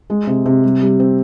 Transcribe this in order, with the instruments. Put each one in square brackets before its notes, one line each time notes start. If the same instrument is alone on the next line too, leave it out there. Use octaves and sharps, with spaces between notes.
[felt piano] G#3
C3
C3
G3
G3
C4